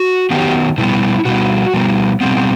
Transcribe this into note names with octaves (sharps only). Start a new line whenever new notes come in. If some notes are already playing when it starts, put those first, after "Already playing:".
Already playing: F#4
D#3 F#3 B3 G4
B2 G3 B3 E4
B2 G3 B3 F#4
B2 G3 B3
B2 G3 B3 C4